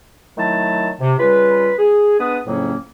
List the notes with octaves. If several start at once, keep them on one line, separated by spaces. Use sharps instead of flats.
D#3 F#3 A3 E4 A5
C3
C#3 G3 F4 B4
G#4
G#3 B3 D4 B4 D#6
F2 A2 C#3 F#3 A#3 C#4